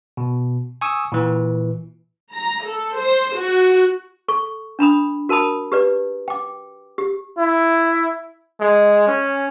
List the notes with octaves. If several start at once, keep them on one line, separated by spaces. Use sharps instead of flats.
B2
G#5 C#6 D#6 E6
A#2 E3
A#5
A4
C5
F#4
A4 C#6
D4 A#5 B5 D#6
F#4 A#4 A5 B5 D#6
G4 B4 D5
G5 D6
G4
E4
G#3
C#4